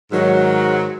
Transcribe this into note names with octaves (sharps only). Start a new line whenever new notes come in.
G#2 D#3 F#3